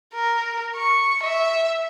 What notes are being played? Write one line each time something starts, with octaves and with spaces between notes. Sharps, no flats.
A#4
C#6
E5